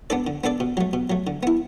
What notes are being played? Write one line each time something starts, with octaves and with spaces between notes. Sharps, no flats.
B3 D4 A4 D5
D3
B3 D4 A4 D5
B2
F#3 A3
B2
F#3 A3
D3
B3 E4